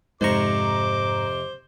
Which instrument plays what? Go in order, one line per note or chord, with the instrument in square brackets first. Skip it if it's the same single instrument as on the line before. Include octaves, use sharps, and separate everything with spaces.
[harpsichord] F2 C3 C#6 [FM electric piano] G#2 A#5 [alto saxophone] C5 [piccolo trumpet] D6